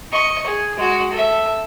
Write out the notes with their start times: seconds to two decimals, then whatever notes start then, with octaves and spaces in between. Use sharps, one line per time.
0.12 D#5 C#6
0.46 G#4
0.77 G#3 F#4
1.12 A4 E5